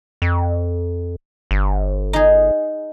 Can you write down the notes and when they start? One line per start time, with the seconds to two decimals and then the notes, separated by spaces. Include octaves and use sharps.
0.22 F2
1.51 G1
2.13 D#4 G#4